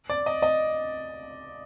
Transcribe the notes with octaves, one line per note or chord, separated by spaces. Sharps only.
D5
D#5
D#5